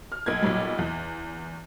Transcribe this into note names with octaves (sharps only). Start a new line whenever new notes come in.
F6
B1 A#3 G#6
B1 A#2 F#3 G3
E2